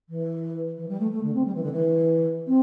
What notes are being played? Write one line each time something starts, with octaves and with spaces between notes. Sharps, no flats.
E3
E3
G3
A3
A3
D3
C4
G3
E3
D3
E3
C4